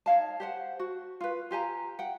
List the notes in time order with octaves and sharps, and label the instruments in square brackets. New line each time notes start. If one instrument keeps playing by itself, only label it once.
[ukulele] D#4 C#5 F5 A5
G4 C5 F#5
F#4
F4 B4
F4 G4 G#5 A#5
F#5 G5